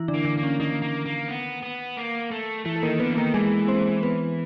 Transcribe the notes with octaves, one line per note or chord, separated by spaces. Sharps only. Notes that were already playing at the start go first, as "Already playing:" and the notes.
Already playing: E3 E4
D3 D4
A#3
D3 D4
A#3
C#4
D#3 A#3 D#4
A#3
A#3
B3
B3
A#3
A3
E3 A3 E4
A4
D#3 A#3 A#4
D3 B3 B4
E3
D#3 A#3 A#4
E3 G#3 G#4
C4 C5
B3 B4